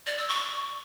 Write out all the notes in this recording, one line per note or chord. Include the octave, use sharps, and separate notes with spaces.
D5
E6
C#6